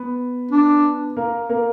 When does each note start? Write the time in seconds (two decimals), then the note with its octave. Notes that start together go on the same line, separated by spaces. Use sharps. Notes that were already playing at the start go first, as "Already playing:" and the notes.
Already playing: B3 B4
0.51 D4
1.17 A#3 A#4
1.49 A#3 A#4